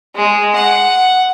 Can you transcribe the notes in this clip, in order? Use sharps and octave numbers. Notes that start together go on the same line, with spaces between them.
G#3
F#5